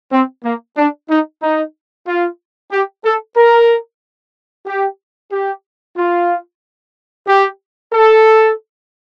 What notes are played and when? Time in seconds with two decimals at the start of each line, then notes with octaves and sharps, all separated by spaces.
0.12 C4
0.44 A#3
0.76 D4
1.09 D#4
1.42 D#4
2.07 F4
2.72 G4
3.04 A4
3.37 A#4
4.66 G4
5.31 G4
5.97 F4
7.27 G4
7.92 A4